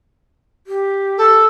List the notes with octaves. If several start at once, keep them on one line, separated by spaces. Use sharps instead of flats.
G4
A4